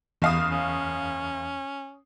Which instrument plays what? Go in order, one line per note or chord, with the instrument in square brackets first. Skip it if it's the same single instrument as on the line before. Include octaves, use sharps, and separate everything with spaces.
[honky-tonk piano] F#1 F5 D#6 [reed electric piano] E2
[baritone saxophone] C#4